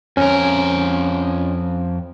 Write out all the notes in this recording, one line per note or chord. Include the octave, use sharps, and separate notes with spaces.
F2 C#4 A#4